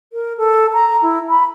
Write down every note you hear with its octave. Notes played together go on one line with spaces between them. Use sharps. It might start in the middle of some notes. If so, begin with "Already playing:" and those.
A#4
A4
A#5
E4
B5